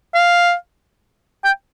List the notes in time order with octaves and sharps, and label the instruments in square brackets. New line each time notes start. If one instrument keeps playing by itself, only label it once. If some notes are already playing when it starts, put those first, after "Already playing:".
[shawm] F5
G5